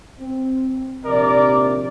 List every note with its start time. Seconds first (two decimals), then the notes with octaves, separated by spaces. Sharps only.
0.20 C4
1.05 A#1 D#2 C3 A#4 D5